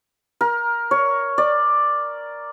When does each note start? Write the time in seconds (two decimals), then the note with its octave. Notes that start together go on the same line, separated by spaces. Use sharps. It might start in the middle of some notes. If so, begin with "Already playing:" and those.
0.41 A#4
0.91 C#5
1.38 D5